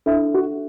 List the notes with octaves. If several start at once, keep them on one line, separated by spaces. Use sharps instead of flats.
D4 E4 A4 E5
F#4